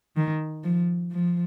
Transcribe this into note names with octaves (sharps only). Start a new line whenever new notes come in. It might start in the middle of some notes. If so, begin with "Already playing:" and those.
D#3
F3
F3